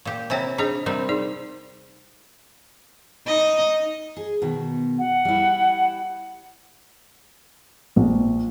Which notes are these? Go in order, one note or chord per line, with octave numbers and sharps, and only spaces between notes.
A#2 G4
C3 E4 C#5 G5 G#5 A#5
D4 D#4 G#4 C5
C3 G3 C4 A#4
D#4 G#4 D5
D#4 D#5
G#4
B2 D#3
F#5
G3 E4
A#1